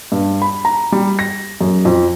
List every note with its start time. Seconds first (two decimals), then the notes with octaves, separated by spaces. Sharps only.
0.12 G2
0.42 B5
0.65 A#5
0.92 G3
1.19 A#6
1.61 F#2
1.85 F2